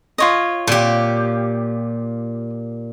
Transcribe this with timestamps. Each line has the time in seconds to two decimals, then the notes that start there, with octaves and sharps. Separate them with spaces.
0.18 F4 C#5 D#5
0.67 A#2 G4